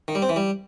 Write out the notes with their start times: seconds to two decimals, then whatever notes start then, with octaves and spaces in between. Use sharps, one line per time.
0.08 D#3
0.15 G3
0.22 C4
0.29 E3
0.36 G3